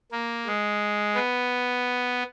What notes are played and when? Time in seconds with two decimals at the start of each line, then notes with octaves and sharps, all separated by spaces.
0.12 A#3
0.46 G#3
1.15 B3